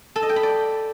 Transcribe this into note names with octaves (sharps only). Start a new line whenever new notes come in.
A4
D#5
G5
B5
D5